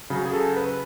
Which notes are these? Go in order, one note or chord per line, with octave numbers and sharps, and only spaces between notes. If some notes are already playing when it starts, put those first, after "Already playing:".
C#3 F#3
G#4
A4
B4